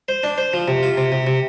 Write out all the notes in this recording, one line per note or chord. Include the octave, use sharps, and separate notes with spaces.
C5
D4
C5
F3
C3
F4
C3
C3
C3